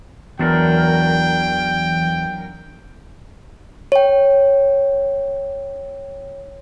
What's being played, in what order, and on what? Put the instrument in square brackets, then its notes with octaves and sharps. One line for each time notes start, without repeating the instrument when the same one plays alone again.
[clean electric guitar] E2 [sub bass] E3 [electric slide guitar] F#3 D4 A#4 [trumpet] G5
[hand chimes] C#5 G5